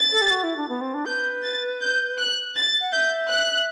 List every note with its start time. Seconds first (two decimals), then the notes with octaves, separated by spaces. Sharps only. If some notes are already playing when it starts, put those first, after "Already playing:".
Already playing: A6
0.12 A4
0.21 G4
0.31 F#4
0.43 E4
0.57 D4
0.69 B3
0.81 C4
0.94 D4
1.06 B4 G6
1.43 A6
1.80 G6
2.18 F#6
2.56 A6
2.81 F#5
2.92 E5 G6
3.30 F#6